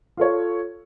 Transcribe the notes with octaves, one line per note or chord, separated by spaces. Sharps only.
F4 A4 C#5